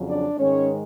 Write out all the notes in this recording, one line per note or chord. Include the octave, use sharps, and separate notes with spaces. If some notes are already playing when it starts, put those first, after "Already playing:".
Already playing: F2 C#3 F#3
D4 D5
G#2 D#3 G#3 C#4 C#5